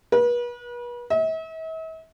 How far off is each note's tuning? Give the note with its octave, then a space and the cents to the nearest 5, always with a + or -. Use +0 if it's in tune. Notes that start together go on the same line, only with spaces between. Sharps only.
B4 -40
E5 -45